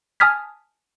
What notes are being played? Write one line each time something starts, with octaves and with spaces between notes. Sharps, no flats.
G#5 A5 D#6 F6 G#6 B6